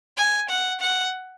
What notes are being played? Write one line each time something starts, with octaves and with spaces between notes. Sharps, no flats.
G#5
F#5
F#5